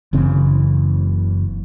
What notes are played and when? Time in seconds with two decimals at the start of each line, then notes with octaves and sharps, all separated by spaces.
0.13 F#1 C#3 E3 C4